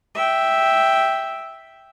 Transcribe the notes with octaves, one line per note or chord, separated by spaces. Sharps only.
E5 G5